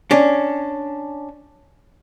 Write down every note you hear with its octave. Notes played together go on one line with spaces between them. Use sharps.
C#4 D4